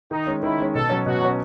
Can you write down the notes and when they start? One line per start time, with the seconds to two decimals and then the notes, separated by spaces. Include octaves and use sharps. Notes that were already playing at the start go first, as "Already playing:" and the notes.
0.11 D#3 D#4
0.27 G#3 C#4
0.42 D#3 E4
0.58 G#3 C#4
0.75 B2 A4
0.90 F#3 C#4
1.06 B2 F#4
1.21 F#3 C#4